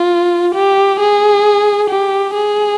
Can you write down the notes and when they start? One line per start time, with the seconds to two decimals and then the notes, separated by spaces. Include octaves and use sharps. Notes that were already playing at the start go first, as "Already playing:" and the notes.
Already playing: F4
0.55 G4
1.00 G#4
1.90 G4
2.34 G#4